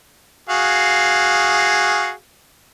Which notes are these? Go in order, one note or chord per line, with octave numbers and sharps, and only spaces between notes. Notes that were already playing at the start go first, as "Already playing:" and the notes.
F#4 G#4 F5